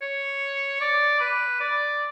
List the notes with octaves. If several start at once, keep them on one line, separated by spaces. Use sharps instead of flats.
C#5
D5
B4
D5